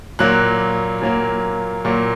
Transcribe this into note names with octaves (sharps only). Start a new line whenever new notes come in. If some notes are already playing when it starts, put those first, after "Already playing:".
A#2 F#3 A#3 F#6
A#2 F#3 A#3
A#2 F#3 A#3